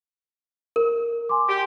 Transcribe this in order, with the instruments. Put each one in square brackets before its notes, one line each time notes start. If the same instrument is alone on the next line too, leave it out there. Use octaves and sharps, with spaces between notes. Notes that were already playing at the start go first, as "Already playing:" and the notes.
[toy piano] A#4
[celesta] G#5 C6 D6
[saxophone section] G4